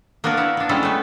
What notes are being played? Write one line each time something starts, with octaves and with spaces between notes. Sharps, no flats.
A#3 B3 D4 F#4 A#4
E4 F#5
B3 D4
G3 G#3 C#4 E4 A4
A3 B3